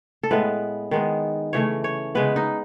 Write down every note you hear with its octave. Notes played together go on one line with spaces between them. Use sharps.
A4
A2 G#3 B3 B4
D#3 G#3 B3
C#3 E3 A3 C#5
C#5
C#3 G#3 B3 B4
D#4